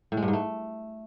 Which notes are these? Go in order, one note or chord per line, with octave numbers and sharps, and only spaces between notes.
A2
G#3
G2
G#2
A3